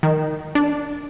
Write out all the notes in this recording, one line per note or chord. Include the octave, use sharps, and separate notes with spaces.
D#3
D4